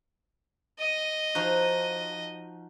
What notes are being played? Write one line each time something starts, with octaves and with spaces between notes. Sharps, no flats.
D#5
F3 D#4 F#4